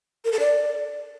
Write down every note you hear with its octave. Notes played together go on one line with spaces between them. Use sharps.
A#4
A4
D5